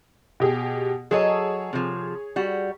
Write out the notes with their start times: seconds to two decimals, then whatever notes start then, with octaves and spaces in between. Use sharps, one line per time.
0.40 B2 G4 G#4
1.11 F#3 G#4 A4 C#5 D#5
1.73 C3 F3
2.36 G3 F#4